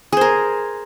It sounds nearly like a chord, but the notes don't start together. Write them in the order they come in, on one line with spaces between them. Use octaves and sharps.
G#4 C5 A#4